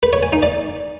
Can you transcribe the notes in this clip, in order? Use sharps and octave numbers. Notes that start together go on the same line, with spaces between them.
B4
C#5
G#5
D#4
D5